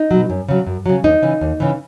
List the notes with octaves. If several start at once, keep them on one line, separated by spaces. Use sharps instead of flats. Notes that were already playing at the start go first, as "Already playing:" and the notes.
Already playing: D#4
B2 F#3
F#2
C#3 F#3
F#2
C#3 F#3
D#2 D#4
C#3 E3
D#2
C#3 E3